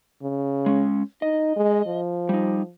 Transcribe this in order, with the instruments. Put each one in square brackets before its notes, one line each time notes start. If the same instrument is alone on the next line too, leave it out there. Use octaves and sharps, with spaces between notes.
[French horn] C#3
[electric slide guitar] G#3 C#4
[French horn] D#4 [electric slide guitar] D#5
[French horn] G#3
F3
[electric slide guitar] G3 D#4